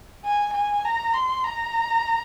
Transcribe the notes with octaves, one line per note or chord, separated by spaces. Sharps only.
G#5
G#5
A#5
C6
A#5